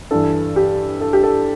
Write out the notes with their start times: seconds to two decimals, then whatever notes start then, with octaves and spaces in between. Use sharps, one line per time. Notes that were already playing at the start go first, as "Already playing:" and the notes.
0.11 G2 E3 A4
0.56 G4
1.01 A4
1.13 G4
1.23 A4